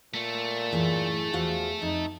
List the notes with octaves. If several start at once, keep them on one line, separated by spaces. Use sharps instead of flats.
A#2 A3
F#2 A2 E3 G#4
E2 F3 F#4 F5
F2 D#4